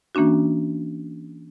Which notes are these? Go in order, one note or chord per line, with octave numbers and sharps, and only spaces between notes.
E3 A#3 C#4 D4 F#4